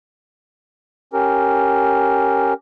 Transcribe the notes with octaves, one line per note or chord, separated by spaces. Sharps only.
C#4 G4 A#4